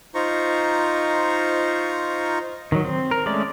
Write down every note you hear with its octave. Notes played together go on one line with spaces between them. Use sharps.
D#4 F4 C5 A#5 C#6
D#3 F#3
C4
A#4
G#3 A3 C#4 D5